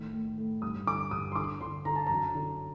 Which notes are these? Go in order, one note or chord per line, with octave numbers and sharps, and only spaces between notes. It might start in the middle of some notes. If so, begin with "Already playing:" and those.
Already playing: A2 D#3
A2
A2
G2 D#6
D3 D6
G2 D#6
C6
D3 D6
D3 C6
D3 A#5
A5
F#2 A#5
D3